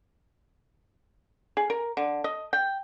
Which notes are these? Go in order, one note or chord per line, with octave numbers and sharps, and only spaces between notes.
G#4
A#4
D3
D#5
G5